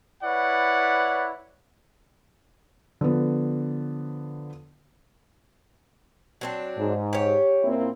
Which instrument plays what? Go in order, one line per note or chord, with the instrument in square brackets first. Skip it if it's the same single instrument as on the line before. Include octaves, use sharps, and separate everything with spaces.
[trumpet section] E4 B4 C#5 D5 F#5
[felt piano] D3 F3 B3
[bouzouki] F#3 C4 D4
[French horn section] G#2
[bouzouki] G4 C#5
[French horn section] A#2 C4 E4